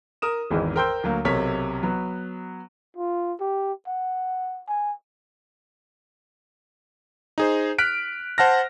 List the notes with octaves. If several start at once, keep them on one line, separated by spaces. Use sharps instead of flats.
A#4 D#6 E7
G#1 E2 G#2 D#3 E3
A#4 C5 G5 C6 E6 G6
D2 F#3 A#3
B1 C3 A#4 C#5 B6
F#3 B3
F4
G4
F#5
G#5
D#4 G#4 C5
F6 F#6 B6 D7
C5 F#5 A5 F6 A#6